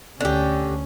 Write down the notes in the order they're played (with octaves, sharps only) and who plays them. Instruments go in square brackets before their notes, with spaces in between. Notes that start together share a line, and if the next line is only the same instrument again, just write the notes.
[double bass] D2 C#4 [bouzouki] D3 G4